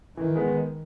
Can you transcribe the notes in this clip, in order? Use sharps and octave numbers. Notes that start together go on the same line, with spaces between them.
D#3 E3
G#3 B3